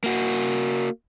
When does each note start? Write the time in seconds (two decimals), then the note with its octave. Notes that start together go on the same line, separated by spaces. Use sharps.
0.04 A#3 F#4